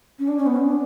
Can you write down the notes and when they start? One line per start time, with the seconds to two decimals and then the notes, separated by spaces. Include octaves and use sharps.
0.19 C#4
0.28 D4
0.38 C#4
0.46 B3
0.56 C#4
0.66 D4